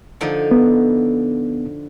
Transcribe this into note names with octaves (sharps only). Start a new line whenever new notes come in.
D3 F3 D#4
B3